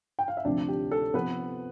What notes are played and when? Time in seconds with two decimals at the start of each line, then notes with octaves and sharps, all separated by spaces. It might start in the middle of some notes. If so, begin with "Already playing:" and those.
0.19 G5
0.28 F5
0.37 E5
0.45 D2 C3 F3 C4 D4 D5
0.68 G4
0.91 A4
1.14 C3 F3 B3 C4 B4